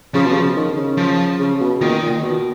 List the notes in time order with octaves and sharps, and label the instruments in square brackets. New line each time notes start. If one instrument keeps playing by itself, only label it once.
[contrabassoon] C#3 [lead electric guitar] F3
[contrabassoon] B2
C#3
D#3
C#3
[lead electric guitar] F3
[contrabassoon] C#3
B2
[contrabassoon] A#2 [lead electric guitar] D#3
[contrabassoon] A#2
B2